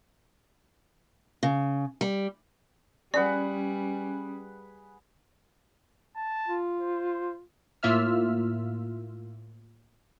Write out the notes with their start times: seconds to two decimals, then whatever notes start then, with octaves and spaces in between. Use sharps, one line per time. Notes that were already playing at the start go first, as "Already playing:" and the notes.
1.43 C#3
2.01 G3
3.14 G3 C#4 G#4 B4 D5 F#5
6.16 A5
6.48 F4
6.81 C5
7.83 A2 A#3 F4 E5 E6 F6